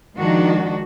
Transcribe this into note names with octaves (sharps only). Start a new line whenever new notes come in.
D#3 F3 G#3 D4 D#4 F#4